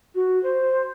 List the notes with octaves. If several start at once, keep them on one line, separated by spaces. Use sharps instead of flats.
F#4
C5